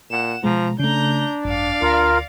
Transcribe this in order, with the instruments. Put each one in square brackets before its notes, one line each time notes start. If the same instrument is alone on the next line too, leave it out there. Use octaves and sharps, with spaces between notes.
[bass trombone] A#2 [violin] F#5 E7
[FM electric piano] B2 G#3 [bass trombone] F3 [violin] A#5
[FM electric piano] C#3 A3 [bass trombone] D4 [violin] A#5 G6
[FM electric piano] G#1 F#2 [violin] D5 F5
[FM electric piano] D2 A#6 [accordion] F4 A#4